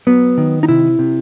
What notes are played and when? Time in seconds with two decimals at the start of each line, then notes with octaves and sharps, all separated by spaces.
0.07 F#3 B3
0.38 D#3
0.63 D#4
0.68 C3 E4
0.99 C3